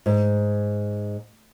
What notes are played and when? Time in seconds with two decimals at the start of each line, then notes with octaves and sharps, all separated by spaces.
0.06 G#2